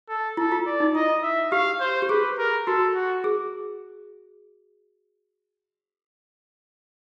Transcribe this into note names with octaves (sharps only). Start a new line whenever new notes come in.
A4
E4 A4
F4
D5
D#4
E4 D#5
E5
G4 F5
C5
G4
G#4 B4
A#4
F#4 A4
F#4
G#4